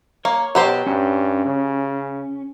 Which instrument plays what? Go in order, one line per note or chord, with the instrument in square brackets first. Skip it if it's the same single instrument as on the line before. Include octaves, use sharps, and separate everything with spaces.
[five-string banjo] A#3 [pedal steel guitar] C#5 C#6
[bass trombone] B2 [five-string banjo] F#3 G4 C5
[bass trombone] G2 [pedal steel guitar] C#4
[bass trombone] C#3